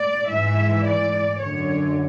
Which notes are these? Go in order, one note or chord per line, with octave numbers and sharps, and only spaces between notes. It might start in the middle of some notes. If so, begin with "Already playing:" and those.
Already playing: D5
G#2 E3 E5
D5
F#2 D3 C#5